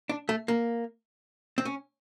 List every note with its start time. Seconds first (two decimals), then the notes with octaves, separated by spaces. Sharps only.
0.09 D4
0.29 A3
0.48 A#3
1.58 C4
1.65 C#4